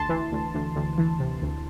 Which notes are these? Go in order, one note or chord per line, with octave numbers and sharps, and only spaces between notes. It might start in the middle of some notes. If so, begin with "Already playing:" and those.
Already playing: D2 A5 C6
E3
D2
D2
D2
E3
C3
D2